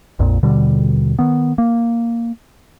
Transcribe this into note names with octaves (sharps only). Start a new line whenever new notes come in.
A#1 F2 A#2
D#2 B2 D3 G3
D#3 B3
A#3